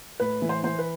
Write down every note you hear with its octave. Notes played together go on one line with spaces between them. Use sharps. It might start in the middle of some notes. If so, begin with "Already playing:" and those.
A2 B4
E3
C5
E3 C5
B4